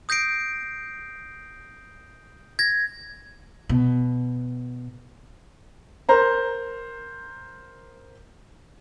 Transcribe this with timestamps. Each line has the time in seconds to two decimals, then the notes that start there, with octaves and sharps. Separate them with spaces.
0.09 D#6 G6 A#6 C7 D7
2.59 G#6 A#6
3.69 B2
6.09 A#4 C5 A#5